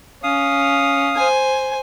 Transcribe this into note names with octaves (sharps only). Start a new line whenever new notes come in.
C#4 F5 D#6
C5 G#5